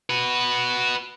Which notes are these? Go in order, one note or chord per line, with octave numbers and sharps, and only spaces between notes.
F#4 B4